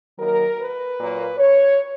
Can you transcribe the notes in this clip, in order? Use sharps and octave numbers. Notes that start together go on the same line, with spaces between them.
D#3 F#3 A#3 A#4
B4
A#2 F#3 A#3
C#5